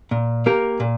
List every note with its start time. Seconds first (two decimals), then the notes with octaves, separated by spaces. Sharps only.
0.11 A#2
0.46 A#3 G4 A#4
0.80 A#2